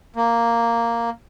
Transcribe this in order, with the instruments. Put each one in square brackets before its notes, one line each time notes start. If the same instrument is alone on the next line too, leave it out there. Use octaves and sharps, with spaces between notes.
[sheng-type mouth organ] A#3